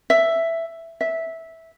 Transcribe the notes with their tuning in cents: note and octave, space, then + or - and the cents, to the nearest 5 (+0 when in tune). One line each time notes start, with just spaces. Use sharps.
E5 +5
E5 -10